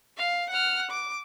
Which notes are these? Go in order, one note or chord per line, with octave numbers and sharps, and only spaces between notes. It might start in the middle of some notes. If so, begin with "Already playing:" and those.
F5
F#5 F6
D6